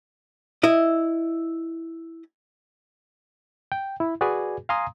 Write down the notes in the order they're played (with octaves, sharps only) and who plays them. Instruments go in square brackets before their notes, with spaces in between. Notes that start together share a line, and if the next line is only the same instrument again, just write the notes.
[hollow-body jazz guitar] E4 D#5
[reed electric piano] G5
E4
F#4 G#4 B4 D5 G#5
F5 G#5 A#5 C6 D#6